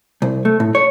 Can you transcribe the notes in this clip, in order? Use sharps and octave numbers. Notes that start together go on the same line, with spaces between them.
C2
A3
A2
C#5